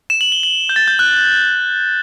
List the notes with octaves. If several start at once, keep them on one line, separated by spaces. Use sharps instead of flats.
E7
F#7
G7
F#7
G6
A6
G6
F#6